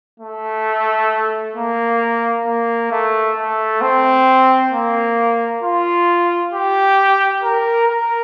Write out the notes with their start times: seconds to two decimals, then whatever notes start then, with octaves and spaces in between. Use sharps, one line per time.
0.20 A3
1.56 A#3
2.46 A#3
2.91 A3
3.37 A3
3.81 C4
4.73 A#3
5.63 F4
6.53 G4
7.44 A#4
7.88 A#4